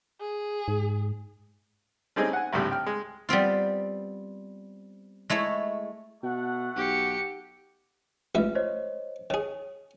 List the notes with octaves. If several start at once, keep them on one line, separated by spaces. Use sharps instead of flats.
G#4
G#2
G3 A3 C4 C#4 D#4 G#4
F#5 G#5
G#1 D2 A2 G3 G4
G5 F6
G#3
G3 B3 C4 F4
G#3 A3 E4 C#5
B2 A3 F#5
B1 G4 C#7
A1 G#2 F4 B4 E5
C5 C#5 D#5
D#3 G#4 C#5